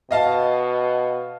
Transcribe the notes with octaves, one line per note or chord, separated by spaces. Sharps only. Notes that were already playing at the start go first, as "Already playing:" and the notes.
B2 D#5 F5 A5